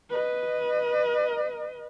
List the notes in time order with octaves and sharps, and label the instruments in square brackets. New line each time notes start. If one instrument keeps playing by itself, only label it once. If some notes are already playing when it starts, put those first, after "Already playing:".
[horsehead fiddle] B4 D#5